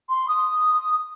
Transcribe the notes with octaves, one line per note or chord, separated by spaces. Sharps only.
C6
D#6